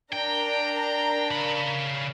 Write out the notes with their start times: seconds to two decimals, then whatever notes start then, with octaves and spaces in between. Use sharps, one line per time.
0.13 D4 A#4 G5 A#5
1.31 C#3 B5